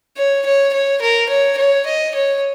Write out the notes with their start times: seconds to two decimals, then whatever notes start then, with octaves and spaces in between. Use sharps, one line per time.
0.17 C#5
0.45 C#5
0.73 C#5
1.02 A#4
1.29 C#5
1.57 C#5
1.86 D#5
2.14 C#5